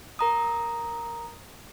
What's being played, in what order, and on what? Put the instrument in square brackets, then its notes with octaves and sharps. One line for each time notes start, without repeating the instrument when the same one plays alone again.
[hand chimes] A#4 A#5 D#6